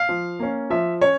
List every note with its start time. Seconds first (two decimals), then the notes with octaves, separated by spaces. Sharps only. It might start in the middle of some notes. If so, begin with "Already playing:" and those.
Already playing: F5
0.09 F3
0.39 A#3 C#4
0.70 F3 E5
1.01 C#4 C#5